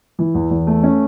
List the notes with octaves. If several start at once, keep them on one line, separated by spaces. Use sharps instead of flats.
E3
E2
E2
A3
C#4